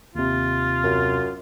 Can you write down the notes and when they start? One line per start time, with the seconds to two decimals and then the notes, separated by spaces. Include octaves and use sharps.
0.15 D#2 C3 F4
0.83 F#2